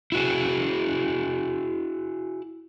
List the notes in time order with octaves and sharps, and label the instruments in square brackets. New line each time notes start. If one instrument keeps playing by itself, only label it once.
[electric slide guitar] E4 F#4 G#4